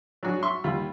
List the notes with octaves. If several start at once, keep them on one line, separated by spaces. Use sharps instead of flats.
F#3 D4 F#4 G#4
E5 C6 C#6
D#2 G3 F4 B5